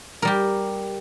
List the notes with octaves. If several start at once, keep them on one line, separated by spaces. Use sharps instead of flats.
G3 G4 A#4